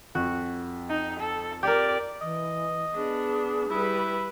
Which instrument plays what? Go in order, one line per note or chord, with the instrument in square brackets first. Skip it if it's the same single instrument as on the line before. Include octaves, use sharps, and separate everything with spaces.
[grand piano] F2 [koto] F#4
[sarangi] D#4
A4
[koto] G4 A#4 [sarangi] D5
[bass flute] E3 [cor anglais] D#5
[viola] B3 D4 [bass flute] G#4
[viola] G3 B4 [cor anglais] E4